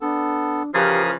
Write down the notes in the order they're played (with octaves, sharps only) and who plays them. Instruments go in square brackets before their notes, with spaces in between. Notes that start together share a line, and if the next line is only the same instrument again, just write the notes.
[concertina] B3 A4 [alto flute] D4
[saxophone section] C#3 E3 F3 [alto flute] G4 [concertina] A#4 D#6